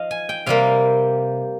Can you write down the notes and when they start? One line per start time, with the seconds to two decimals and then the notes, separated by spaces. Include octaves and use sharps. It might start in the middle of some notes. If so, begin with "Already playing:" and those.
Already playing: F3 D#5 F5
0.11 G#5
0.29 G5
0.46 C3 G3 A#3 F5